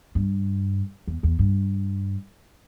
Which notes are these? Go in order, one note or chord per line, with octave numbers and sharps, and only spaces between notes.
G2
E2
E2
G2